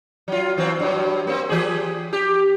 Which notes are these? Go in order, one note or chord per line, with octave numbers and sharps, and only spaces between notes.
F#3 F4
E3 F#3 C4
G2 F#3
A#3 C4
E3 G4 G#4
G4